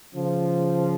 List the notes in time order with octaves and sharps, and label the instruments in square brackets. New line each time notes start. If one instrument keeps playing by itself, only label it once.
[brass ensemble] C#3 F3